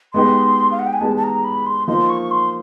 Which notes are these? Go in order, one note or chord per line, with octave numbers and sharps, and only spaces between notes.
G#3 B3 D#4 G4 C6
F5
F#5
G5
G#5
G#3 B3 D#4 G4 A5
A5
A#5
B5
C6
F3 A#3 D#4 C6
C#6
C6